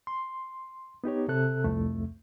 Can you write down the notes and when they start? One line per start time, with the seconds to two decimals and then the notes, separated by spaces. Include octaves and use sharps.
0.07 C6
1.04 B3 D#4 G4 C#5
1.28 C3 A4 F#6
1.64 C2 F2 A3